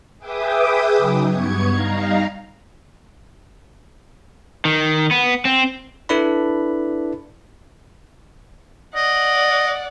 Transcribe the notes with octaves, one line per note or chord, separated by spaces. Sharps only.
G#4 B4 E5 G5 D6 D#6
C#3 F#3 D#4
G2 B3 C#6 G#6 C#7
G3 D#4 F5 A#5
D#3
B3
C4
D4 E4 A4 B4 D5 B5
D5 D#5 F#5